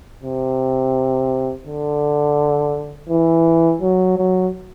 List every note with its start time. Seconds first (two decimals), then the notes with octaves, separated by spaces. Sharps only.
0.23 C3
1.67 D3
3.10 E3
3.81 F#3
4.18 F#3